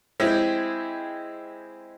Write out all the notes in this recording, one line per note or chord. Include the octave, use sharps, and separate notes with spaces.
G#3 C4 E4 G4